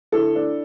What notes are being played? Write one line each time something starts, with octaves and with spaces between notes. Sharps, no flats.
D3 E4 A4
D4